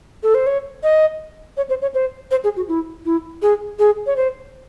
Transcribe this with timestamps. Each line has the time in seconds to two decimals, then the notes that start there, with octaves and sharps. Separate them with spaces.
0.23 A4
0.35 C5
0.47 C#5
0.83 D#5
1.57 C#5
1.69 C5
1.82 C#5
1.94 C5
2.31 C5
2.44 G#4
2.56 F#4
2.68 E4
3.05 E4
3.42 G#4
3.79 G#4
4.07 C#5
4.16 C5